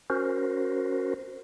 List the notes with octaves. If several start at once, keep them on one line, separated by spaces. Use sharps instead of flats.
C#4 F#4 A#4 C5